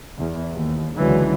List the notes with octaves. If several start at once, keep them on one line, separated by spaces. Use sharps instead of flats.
E2
D#2
C#2 D3 E3 F#3